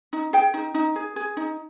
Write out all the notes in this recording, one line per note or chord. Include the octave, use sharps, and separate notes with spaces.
D#4
G#4 G5
D#4
D#4
G#4
G#4
D#4